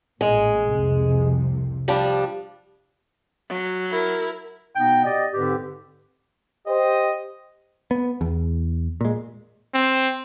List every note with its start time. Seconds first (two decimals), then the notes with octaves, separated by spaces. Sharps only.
0.21 A1 A#2 G#3
0.71 C2 F2 C3
1.88 F3 G3 D4
3.49 F#3
3.90 E4 A#4
4.76 B2 B3 D#4 G5
5.03 G4 D5 D#5
5.34 G#2 D3 C4 G4 B4
6.67 G4 C5 D#5
7.91 B3
8.21 E2
9.01 A#2 G#3
9.74 C4